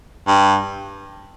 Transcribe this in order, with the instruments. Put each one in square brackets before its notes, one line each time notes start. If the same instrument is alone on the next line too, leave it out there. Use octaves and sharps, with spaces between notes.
[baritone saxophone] G2